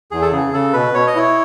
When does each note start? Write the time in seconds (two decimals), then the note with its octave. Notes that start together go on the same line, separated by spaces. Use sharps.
0.11 E2 G#4
0.22 A4
0.32 C#3 G#4
0.54 C#3 A4
0.73 B2 B4
0.94 B2 C#5
1.07 D#5
1.16 E4 C#5